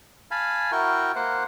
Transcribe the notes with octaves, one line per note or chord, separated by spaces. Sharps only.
F5 G#5 A5 B5
E4 F#4 A#4 G5 C#6
A#3 C5 F#5